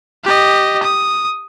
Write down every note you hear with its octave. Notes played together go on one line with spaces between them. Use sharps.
G4 D#5
D#6